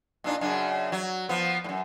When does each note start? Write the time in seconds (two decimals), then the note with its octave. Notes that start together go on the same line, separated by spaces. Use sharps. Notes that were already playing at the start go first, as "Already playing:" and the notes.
0.24 A#2 D4 D#4
0.41 F#2 C#3 D4
0.92 F#3
1.29 F3 B3
1.64 F#2 A2